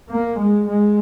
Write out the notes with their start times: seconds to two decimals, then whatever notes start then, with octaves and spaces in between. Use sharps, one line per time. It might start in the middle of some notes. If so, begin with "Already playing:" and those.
0.10 A#3
0.39 G#3
0.67 G#3